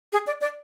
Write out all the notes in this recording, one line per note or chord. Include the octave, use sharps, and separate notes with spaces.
G#4
D5
D5